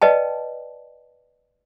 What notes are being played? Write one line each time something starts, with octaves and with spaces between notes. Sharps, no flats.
B4 D5 D#5 G5 A5